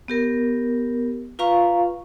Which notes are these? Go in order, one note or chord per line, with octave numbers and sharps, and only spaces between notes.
B3 G4 A#4
F4 B4 F5 A#5 C#6